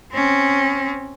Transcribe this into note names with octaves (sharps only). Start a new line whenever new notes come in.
C4 C#4